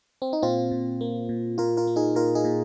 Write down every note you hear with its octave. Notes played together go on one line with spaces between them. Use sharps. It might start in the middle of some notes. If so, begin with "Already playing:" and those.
C4
D#4
A#2 C4 F4
A#2
A#3
A#2
A#2 F4 A#4
F4 A#4
A#3
D#4 G#4
A#2 F4 A#4
D#4 G#4
A#2